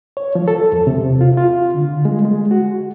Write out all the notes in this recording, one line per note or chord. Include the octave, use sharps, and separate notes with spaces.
C#5
F3
A4
E2
C3
F4
F4
D3
G#3
G#3
F#4